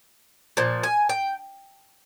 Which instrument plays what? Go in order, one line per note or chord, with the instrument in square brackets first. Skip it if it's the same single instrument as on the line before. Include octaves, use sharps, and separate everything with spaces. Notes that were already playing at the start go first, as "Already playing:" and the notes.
[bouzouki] A#2 F3
G#5
G5